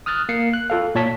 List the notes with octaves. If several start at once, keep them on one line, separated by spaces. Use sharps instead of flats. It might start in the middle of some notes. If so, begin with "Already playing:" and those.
D#6 F6 F#6 A6
A#3 C7 C#7
F#6
F4 A4 F5
A#2 C#5 A5 B6